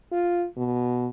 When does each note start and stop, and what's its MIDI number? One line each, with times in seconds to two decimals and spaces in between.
0.12 0.46 65
0.57 1.08 47